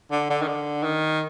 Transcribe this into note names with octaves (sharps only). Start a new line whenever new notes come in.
D3
D3
D#3
D3
D#3